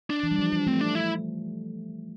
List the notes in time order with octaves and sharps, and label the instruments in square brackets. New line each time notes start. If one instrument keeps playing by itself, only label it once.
[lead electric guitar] D4
[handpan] E3
G3
F3
G3
[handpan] A3 [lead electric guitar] C4
[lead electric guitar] D4
E4